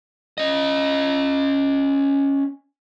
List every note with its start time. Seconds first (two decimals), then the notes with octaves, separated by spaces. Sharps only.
0.38 C#4 D#5